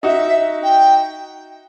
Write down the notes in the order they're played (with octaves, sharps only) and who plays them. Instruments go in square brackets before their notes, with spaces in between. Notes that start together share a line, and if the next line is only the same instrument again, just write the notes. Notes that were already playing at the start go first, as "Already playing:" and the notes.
[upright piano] D#4 F#4 [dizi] E5
[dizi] G5